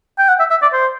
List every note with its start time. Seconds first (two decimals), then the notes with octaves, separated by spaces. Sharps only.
0.18 G5
0.29 F#5
0.39 E5
0.50 E5
0.62 D5
0.73 C5